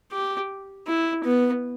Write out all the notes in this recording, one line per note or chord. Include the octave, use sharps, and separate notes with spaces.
G4
E4
B3